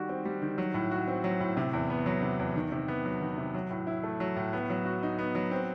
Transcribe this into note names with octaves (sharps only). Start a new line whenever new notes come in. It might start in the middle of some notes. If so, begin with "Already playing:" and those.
Already playing: D#3 G3 F#4
C4
G3
D#3
F#3
A2
F#4
C4
F#3
A2
C3
E2
B3
F#3
C3
E2
D#3
C3
B3
F#3
D#3
C3
F#3
A2
E4
A3
F#3
A2
B3
F#3
F#4
D#4
B3
F#3
C4